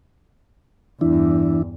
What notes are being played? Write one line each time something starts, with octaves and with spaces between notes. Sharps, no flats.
E2 G2 E3 D4 E4